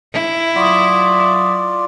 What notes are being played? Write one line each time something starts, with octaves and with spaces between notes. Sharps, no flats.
E4
F#3 F4 D5 C#6 D#6